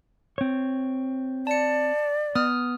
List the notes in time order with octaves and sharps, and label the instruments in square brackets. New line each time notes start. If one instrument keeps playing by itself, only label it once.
[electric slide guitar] C4 C#5
[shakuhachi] D5 [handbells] A5 C#7
[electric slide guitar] B3 [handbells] D#6 F6